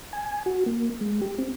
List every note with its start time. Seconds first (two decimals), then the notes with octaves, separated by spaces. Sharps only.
0.13 G#5
0.46 F#4
0.66 A#3
1.01 G#3
1.21 G4
1.38 C4